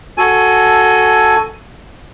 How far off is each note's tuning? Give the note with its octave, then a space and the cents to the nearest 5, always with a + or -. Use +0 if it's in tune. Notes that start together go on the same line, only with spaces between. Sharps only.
F#4 +0 A4 +0 G#5 +15